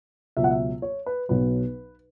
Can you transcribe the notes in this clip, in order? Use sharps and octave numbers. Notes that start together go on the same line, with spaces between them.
C#2 B2 F#3 E5
F#5
E5
C#5
B4
B1 B2 F#3 B4